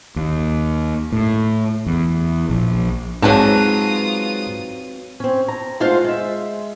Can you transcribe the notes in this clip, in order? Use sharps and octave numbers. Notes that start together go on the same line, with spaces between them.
D#2
A2
E2
A#1
G#2 F#3 C4 F4 B4 A5 D#6
C4 C#4
A#5
G#3 A3 F4 C5 F5 F#5
G#3 E5